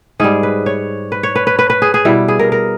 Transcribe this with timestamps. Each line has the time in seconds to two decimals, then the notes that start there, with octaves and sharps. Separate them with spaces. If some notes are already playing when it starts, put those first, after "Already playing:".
0.20 G#2 G3 G#4
0.43 B4
0.66 C#5
1.12 B4
1.23 C#5
1.36 B4
1.47 B4
1.59 B4
1.70 B4
1.82 G#4
1.94 G#4
2.05 B2 G3 E4
2.28 G#4
2.39 A#4
2.52 A#4